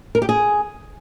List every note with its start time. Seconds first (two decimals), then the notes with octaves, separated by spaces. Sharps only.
0.15 A#4
0.22 G4
0.29 G#4